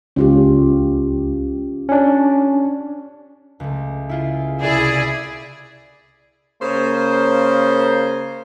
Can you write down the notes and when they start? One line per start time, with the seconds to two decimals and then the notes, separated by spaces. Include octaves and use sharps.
0.16 C#2 C#4 F4 G4
1.89 C#4 D4
3.60 C#2 A3
4.09 E4 F4 G#4
4.62 C2 E4 G#4 D5
6.61 C#3 A#3 C5